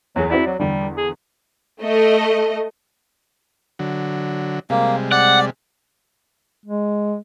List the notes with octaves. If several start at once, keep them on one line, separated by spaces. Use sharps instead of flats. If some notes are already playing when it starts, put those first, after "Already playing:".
E2 F#3 G#4
C4 E4 F#4 D5
F#3
E2 D3 G3
G#4
A3 D#5
D3 F#3
C3 G3 G#3 A#3
D5 F#5
G#3